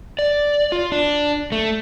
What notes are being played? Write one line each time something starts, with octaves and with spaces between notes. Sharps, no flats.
D5
F4
D4
A3